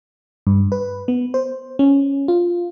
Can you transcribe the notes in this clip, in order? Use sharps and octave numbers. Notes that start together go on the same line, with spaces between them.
G2
B4
B3
C5
C#4
F4